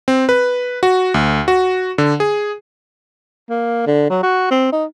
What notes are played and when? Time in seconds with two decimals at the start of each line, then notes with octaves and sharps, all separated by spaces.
0.08 C4
0.29 B4
0.83 F#4
1.14 D2
1.48 F#4
1.98 D3
2.20 G#4
3.50 A#3
3.87 D3
4.10 F#3
4.23 F#4
4.51 C4
4.72 D#4